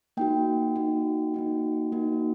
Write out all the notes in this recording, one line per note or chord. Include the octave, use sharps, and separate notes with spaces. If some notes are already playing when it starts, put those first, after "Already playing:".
A#3 D#4 F#4 G5
A#3 D#4 F#4
A#3 D#4 F#4
A#3 D#4 F#4